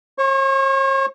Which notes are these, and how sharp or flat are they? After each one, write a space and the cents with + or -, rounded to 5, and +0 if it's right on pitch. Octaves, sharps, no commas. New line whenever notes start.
C#5 -45 C#6 +0